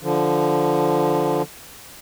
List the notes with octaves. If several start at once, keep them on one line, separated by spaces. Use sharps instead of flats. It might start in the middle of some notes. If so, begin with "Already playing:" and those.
D3 F3